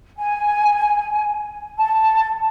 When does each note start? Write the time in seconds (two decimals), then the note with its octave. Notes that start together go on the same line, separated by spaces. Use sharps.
0.17 G#5
1.76 A5